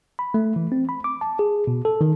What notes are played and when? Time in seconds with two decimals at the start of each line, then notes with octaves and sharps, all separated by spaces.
0.19 B5
0.34 A3
0.56 E3
0.72 C4
0.89 B5
1.04 D6
1.21 A5
1.39 G#4
1.67 B2
1.85 A4
2.01 D#3